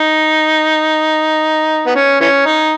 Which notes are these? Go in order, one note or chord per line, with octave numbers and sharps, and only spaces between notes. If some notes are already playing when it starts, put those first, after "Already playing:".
Already playing: D#4
B3
C#4
E3 C#4
D#4